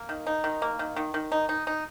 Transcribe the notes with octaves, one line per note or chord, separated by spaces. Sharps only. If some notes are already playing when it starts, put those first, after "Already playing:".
Already playing: A#3
D#3
D#4
D#3
A#3
D#3
D#3
D#3
D#4
D#4
D#4